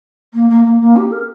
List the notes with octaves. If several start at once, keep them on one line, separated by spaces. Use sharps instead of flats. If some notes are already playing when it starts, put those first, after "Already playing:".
A#3
A#3
A#3
A#3
G4
A#4